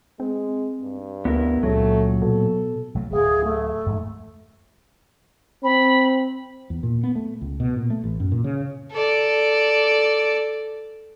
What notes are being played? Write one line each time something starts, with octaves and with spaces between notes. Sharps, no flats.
G#3 C4
G2
D2 B3 E4 A#4
C#2 A#2 F#3 A3
B2 A4
B1 F#3 A3
D1 G#4
A3
F2 G#2 F3
C4 B5
E2
A#2
B3
A3
C#2
B2
A#2
A3
A1
F#2
A#2
C#3
A4 D5